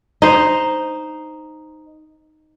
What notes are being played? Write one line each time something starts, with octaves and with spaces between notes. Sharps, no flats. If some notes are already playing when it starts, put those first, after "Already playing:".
D#4 C5